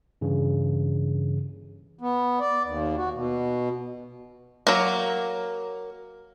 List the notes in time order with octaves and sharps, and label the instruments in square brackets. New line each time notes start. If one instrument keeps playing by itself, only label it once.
[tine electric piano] G2 C#3 E3
[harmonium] B3
D5
D#2
F#4
B2
[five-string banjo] F#3 A#3